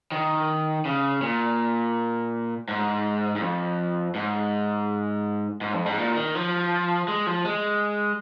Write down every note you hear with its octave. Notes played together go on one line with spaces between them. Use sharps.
D#3
C#3
A#2
G#2
G#2
F2
G#2
G#2
F2
G#2
A#2
D#3
F3
G#3
F3
G#3